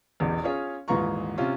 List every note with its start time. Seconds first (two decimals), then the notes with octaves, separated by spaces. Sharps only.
0.20 E1 A1 E2
0.43 C#4 F4 G#4 C#5
0.88 D#1 G#2 E3 F4 A#5 C#6
1.38 C3 C#4 F4